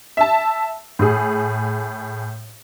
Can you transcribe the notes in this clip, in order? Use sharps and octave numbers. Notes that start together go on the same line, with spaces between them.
E5 A5
A2 G#4